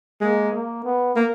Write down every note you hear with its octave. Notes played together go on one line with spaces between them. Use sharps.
G#3 A#3
A#3
B3
A#3